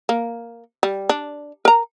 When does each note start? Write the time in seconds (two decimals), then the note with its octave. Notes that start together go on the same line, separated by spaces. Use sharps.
0.09 A#3
0.83 G3
1.09 D4
1.65 A#4 A#5